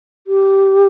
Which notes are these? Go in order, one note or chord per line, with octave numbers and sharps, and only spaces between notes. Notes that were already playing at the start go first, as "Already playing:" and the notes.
G4